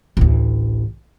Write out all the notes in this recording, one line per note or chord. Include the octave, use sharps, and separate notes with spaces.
A1 D2